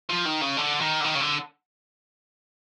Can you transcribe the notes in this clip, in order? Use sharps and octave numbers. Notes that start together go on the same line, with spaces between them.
F3
D#3
C#3
D3
D#3
D3
D#3
C#3
D3